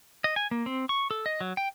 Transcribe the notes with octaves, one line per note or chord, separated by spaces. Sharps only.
D#5
G#5
A#3
C4
C#6
A4
D#5
F#3
G5